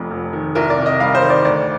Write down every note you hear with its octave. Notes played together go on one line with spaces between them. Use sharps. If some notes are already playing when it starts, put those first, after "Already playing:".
Already playing: F1 F2
F1
D#3
C2 A#4
D5
C3
D#5
G3 F5
C5
D#3
D5
D2 D5